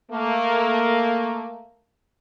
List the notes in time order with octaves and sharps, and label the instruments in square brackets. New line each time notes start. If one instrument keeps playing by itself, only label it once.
[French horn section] A3 A#3